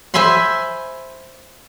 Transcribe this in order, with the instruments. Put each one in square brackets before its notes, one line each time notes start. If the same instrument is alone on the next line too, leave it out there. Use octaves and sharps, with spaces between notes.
[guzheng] C5 E5 G#5 B5 C6